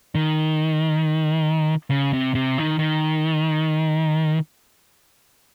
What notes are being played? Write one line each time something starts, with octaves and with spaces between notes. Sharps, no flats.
D#3
C#3
C3
C3
D#3
D#3